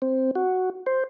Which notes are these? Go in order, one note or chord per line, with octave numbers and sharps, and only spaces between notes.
C4
F#4
C5